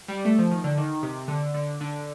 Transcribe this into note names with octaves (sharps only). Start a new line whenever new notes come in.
G3
A3
F3
D#3
D3
D#3
C3
D3
D3
D3